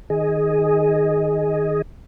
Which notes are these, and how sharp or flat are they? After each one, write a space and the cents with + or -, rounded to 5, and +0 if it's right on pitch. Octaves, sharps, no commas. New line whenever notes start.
D#3 +0 G#4 +0 D#5 +0